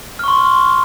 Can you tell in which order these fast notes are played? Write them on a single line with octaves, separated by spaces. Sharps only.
F6 C#6 C6